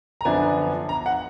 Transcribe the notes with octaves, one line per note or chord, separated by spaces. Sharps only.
A#5
F#2 D3 F3 B3 D4 G#5
A#5
F#5